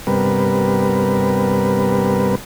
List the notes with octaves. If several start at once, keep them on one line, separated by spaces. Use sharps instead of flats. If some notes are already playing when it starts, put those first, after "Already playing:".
G2 C3 G3 B3 A#4 B4